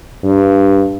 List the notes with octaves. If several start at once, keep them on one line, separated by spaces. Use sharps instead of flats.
G2